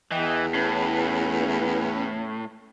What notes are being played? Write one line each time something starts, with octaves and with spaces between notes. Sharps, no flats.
E2 E3 D#5 G5
A2 C#4 B4